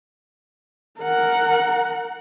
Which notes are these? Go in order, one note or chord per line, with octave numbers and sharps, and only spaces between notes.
A#4 F#5